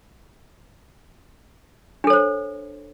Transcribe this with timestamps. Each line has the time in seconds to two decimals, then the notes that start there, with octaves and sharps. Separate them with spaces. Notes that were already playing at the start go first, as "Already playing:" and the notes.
2.04 D4
2.07 A4
2.10 C#5
2.13 C5